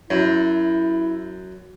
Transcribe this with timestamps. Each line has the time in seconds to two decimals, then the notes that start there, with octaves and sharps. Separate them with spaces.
0.10 F#2 E4